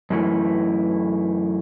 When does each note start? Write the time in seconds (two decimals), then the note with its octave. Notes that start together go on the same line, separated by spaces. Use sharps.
0.10 F#2 E3 A3